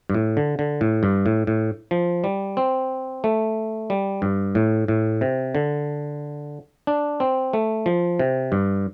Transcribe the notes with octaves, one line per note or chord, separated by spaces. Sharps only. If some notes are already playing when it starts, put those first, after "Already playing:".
G2
A2
D3
D3
A2
G2
A2
A2
F3
G3
C4
A3
G3
G2
A2
A2
C3
D3
D4
C4
A3
F3
C3
G2